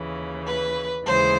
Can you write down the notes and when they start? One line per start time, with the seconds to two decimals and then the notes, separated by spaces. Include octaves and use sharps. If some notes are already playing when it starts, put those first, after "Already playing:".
Already playing: D#2 C#3 E3
0.46 B4
1.05 D#2 C#3 E3 G#3 C5